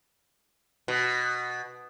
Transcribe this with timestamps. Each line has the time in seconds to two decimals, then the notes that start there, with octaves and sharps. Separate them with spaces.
0.88 B2